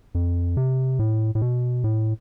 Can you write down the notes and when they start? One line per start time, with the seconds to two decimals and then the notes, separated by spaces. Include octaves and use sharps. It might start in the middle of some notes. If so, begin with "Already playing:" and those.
0.15 F2
0.57 C3
0.99 A2
1.35 A2
1.42 B2
1.84 A2